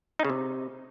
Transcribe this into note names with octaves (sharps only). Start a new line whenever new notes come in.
D#4
C#3
C3